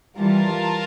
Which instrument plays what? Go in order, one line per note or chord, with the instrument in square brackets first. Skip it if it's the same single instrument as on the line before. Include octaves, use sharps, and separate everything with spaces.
[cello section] E3 G3 [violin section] F4 A#4 F5 A5